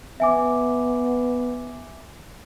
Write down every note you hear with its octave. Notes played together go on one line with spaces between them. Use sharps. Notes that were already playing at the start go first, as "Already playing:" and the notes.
B3 E5 G#5 D6